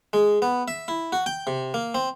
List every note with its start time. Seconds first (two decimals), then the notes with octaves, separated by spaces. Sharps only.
0.13 G#3
0.42 B3
0.68 E5
0.88 E4
1.12 F#4
1.26 G5
1.47 C3
1.74 A#3
1.95 C4